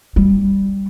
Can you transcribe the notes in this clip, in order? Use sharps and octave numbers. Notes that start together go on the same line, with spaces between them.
G3